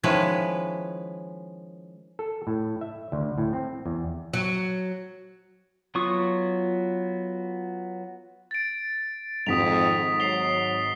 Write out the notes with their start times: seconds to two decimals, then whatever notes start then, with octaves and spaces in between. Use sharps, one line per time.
0.03 D#3 F3 G#3 C#4 E4 B4
2.19 A4
2.47 A2
2.81 E5
3.12 D2
3.38 A2
3.53 C4
3.86 E2
4.34 F#3
5.95 F#3 B3 F4 C#6 D#6
8.51 A6 D7
9.47 G#1 F2 G#2 D#6 B6 F7
10.20 F#3 C7 F7 G7